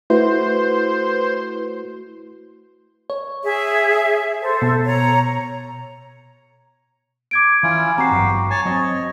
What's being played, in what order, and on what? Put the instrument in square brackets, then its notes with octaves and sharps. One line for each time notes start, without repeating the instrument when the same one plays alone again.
[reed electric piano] A3 F#4 [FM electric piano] E4 B4 [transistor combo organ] C5
[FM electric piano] C#5
[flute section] G#4 E5
A4 C5
[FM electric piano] B2
[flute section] C#5 A#5
[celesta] D6 G#6 D7
[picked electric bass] E3 [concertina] C#4 E4 F4
[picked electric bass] C4 [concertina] F#4 G4 [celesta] A#5 C7
[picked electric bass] G#1 G2 F#3
[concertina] C#5 G#5 A5
[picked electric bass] F#3 C4 [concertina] C#5 D#5